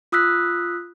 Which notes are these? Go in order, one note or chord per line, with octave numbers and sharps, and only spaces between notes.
F4 D#6 E6 F#6 B6